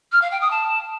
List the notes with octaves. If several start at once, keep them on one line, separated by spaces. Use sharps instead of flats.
F6
F5
G5
D#6
A5